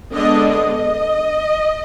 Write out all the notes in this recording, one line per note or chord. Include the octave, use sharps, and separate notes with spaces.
D3 G#3 B3 D4 D#5
D#5